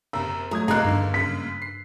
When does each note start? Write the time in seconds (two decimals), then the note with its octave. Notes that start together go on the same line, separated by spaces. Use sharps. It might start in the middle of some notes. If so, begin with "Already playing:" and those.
0.13 F#1 C3 A#5 E6
0.51 F#3 A3 A#5 D#6 G#6
0.68 C3 F3 A#3 D#4 G#4 A#5 F#6
0.84 E2 G2 D3 D#3
1.14 F#2 C#3 B6
1.62 C7